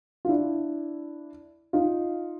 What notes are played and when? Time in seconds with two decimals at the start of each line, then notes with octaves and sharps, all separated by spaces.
0.25 F4
0.29 D4 E4
1.73 D#4 F4